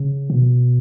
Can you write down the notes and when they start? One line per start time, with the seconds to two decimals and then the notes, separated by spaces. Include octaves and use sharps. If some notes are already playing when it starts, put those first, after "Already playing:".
Already playing: C#3
0.30 B2